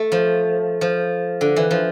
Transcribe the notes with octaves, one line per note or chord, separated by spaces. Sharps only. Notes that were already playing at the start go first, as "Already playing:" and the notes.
Already playing: A3
F3
F3
D3
E3
F3